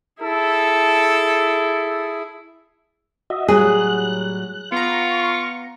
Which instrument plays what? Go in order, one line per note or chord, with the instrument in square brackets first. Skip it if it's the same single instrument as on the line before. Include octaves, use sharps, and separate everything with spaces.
[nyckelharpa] E4 G#4 [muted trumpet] A4
[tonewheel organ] F#4 D#5 E5
[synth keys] A2 F#3 G3 [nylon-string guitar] G#4 [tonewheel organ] F#6
[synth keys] B3 A#5 [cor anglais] F4 [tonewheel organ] C#6